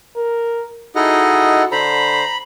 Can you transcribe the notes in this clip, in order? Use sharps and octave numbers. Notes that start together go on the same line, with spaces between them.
A#4
D#4 E4 F#4 G#4 A4 D#5 F#5
D3 C5 A#5 B5